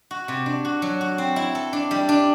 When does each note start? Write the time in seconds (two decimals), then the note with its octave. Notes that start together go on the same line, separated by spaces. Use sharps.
0.11 F#4
0.28 C3
0.46 D4
0.65 F#4
0.82 F#3
1.01 F#4
1.18 C4
1.36 E4
1.55 A4
1.73 D4
1.91 G3
2.09 D4